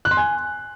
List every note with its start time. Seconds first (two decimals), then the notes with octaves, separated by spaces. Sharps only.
0.05 F#6
0.11 C6
0.17 G#5